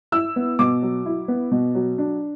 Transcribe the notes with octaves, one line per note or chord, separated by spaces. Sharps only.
E4 E6
B3
B2 D6
F#3
E4
B3
B2
F#3
D4